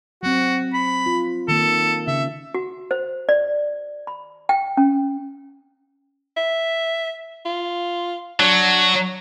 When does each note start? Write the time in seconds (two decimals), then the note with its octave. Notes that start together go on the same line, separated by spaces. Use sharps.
0.23 F#3 C4 F#4
0.74 B5
1.06 F4
1.48 D#3 A#3 A4
2.07 C#3 E5
2.54 F#4
2.91 C5
3.29 D5
4.07 B5
4.49 G5
4.77 C#4
6.37 E5
7.46 F4
8.40 F#3 D4